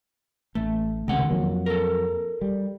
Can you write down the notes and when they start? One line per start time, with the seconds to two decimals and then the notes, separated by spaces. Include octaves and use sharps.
0.55 A1 A3
1.08 C#2 C3 D#3 F#5
1.30 F2 F#3 A#3
1.66 A4 A#4
2.41 G3